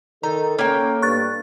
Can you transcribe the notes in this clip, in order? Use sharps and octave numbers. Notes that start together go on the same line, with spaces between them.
D#3 D#4 A4 A#5
A#3 C#4 G5
G2 C#6 F#6 A6